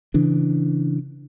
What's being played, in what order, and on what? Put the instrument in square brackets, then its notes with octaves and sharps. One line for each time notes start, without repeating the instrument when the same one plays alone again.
[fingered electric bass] C#3 E3 D4